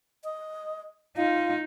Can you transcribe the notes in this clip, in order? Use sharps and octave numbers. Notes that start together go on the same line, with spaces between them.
D#5
D#4 F4 F5